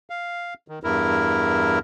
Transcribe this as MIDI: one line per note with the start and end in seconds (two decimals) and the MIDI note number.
0.10 0.54 77
0.68 0.79 51
0.84 1.79 40
0.84 1.79 43
0.84 1.79 64
0.84 1.79 70